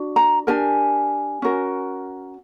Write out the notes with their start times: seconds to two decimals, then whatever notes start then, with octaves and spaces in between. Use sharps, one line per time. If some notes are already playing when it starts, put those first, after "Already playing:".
Already playing: D4 F#4
0.16 A#5
0.47 D4 G4 A#4 G#5
1.42 C#4 F#4 A#4